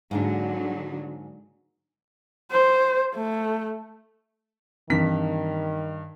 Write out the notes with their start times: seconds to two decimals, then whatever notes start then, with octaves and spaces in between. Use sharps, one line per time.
0.11 G#2 D3 F#3 G#3 A#3 D4
2.52 C5
3.15 A3
4.90 G2 D#3 E3 C4 B6